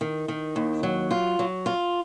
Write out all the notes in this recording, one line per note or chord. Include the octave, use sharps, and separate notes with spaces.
D#3
D#3
D#2
F#3
F4
F#3
F4